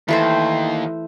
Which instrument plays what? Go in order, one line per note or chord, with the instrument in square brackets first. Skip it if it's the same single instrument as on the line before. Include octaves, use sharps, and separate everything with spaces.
[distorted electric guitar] D#2 [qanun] E3 A3 C5